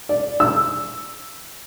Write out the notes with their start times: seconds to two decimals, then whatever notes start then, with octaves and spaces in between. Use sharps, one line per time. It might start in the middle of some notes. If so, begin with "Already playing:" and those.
0.09 D5
0.40 E6